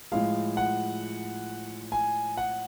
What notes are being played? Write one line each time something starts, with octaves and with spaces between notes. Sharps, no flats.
A2 F3 G#3 F5
F#5
G#5
F#5